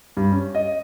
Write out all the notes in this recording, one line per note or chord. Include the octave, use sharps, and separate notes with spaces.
G2
C#4
D#5